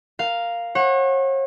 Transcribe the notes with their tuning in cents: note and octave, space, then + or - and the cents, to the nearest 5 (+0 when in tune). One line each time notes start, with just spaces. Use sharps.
A#4 +0 F5 +0
C#5 -40 F#5 +0